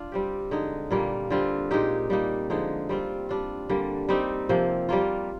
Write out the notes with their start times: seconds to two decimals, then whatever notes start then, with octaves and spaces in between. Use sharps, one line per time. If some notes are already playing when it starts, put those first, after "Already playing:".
Already playing: D4 F4
0.12 G3 C4 G4
0.51 D3 G#3 D#4
0.91 A#2 G3 A#3 F4
1.30 D3 G3 C4 F4
1.71 A#2 G#3 D#4 G4
2.10 G3 A#3 D#4
2.50 D3 F3 G#3 D#4
2.89 G3 C4 F4
3.29 G3 D4 F4
3.69 D3 G3 A#3
4.09 G3 C4 D#4 G4
4.49 C3 F3 A#3
4.89 G3 A#3 F4